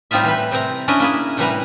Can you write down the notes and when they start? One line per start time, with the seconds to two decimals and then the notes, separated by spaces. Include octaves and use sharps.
0.11 A2 G3 C4 D#4 F4 E5
0.24 E3 B4
0.51 C3 C4 A#5
0.88 C#4 D4 E4 D#5
1.00 A#3 E4 G#4
1.37 A2 C3 E3 G3 B4 A#5